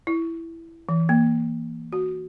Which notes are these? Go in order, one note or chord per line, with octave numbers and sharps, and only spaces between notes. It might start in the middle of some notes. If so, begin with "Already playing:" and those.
E4
E3
A#3
F#4